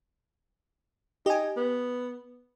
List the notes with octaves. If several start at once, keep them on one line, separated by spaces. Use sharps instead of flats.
D#4 G4 G#5
B3